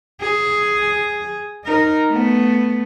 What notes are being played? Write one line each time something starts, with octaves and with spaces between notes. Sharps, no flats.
G#4
D#4 A#4
A3 B3